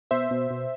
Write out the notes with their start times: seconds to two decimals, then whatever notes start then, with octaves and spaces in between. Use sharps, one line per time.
0.11 B2 C5 E5
0.31 B2
0.50 B2